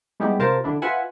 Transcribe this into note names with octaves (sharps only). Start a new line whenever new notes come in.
G3 G#3 B3 D#4 E4 G4
C3 F4 A#4 C5 A5
D3 D4 E4
F4 B4 E5 F#5 G#5